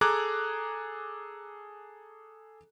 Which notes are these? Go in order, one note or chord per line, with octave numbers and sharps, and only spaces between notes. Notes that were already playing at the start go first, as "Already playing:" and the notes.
G#4 A4 A#5 D6 F#6 G#6